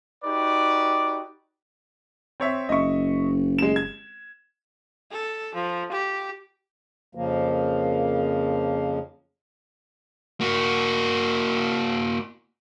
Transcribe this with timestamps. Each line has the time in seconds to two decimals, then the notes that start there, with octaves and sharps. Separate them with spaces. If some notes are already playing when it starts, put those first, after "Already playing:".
0.24 D#4 F#4 G4 B4 D5
2.40 C4 C#5 E5
2.69 F#1 D#5 E5 C#6
3.59 G#3 E7
3.76 G#6
5.12 A4
5.55 F3
5.92 G4
7.15 F2 C#3 F3 A#3
10.41 A#3 F#4